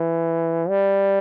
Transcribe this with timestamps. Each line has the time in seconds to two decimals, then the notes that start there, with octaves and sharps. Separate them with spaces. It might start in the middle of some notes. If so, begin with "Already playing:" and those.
Already playing: E3
0.69 G3